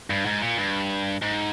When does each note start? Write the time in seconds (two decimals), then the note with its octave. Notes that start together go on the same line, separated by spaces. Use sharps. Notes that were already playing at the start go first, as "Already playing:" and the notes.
0.10 G2
0.26 G#2
0.42 A#2
0.58 G2
1.22 G#2